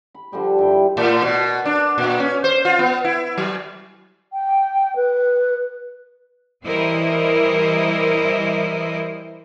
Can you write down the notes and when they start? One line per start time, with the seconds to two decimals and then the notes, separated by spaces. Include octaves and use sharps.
0.15 B5
0.32 D3 F3 G3 C5
0.58 G2 E4 G5
0.71 B5
0.97 A2
1.22 B2
1.65 D4
1.98 A#2
2.20 C#4
2.44 C5
2.65 F4
2.79 B3
3.04 E4
3.38 F#3
4.33 G5
4.96 B4
6.65 E3 G3 E4 A#4 C5 D#5